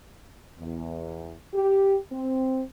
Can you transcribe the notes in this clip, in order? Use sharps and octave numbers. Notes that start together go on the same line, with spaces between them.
E2
G4
C4